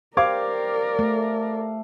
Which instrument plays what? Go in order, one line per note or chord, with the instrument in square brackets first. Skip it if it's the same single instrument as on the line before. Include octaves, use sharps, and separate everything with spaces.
[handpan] G4 C5 [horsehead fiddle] A#4 D5 [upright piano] F5 D6 G#6
[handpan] A3